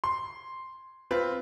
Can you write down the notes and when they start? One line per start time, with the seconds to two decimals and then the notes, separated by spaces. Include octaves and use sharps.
0.04 C6
1.11 C4 F4 B4